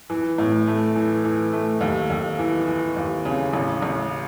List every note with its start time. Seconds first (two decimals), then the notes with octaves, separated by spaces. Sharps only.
0.10 E3
0.38 A2
0.67 A3
0.95 E3
1.24 E3
1.53 A3
1.81 D#2
2.10 D#2
2.39 E3
2.67 E3
2.96 D#2
3.25 C#3
3.53 A1
3.82 A1